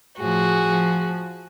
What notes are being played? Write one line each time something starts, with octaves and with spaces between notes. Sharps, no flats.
A2 F3 F#4 G#4
F3